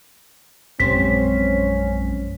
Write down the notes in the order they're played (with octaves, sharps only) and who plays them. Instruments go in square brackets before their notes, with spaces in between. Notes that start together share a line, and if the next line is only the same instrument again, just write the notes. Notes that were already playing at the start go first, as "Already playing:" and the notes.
[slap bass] A#1 F#2 G#3 [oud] C4 G4 C5 [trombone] C#4 [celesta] B6